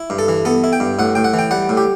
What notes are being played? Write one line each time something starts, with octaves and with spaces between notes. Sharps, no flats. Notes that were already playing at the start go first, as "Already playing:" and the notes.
Already playing: E4
G2
A4
E3
B3 A4
E4
G5
G2
A2 F#5
A2 G5
F#5
E3
G5
G3 F#5
A2
G4